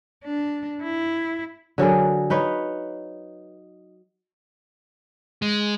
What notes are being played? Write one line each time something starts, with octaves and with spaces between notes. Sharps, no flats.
D4
E4
D3 F#3 G#4 A#4
D#4 B4 C#5
G#3